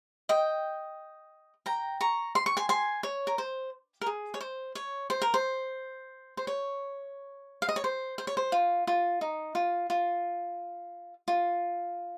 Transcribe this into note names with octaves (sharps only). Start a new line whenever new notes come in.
D#5 G5
G5 A#5
A#5 C#6
C6
C#6
G#5 C6
G#5 C6
C#5
A#4
C5
A#4
G#4
C#5
C5
C#5
C5
A#4
C5
C5
C#5
F5
D#5
C#5
C5
C5
C#5
C5
F4
F4
D#4
F4
F4
F4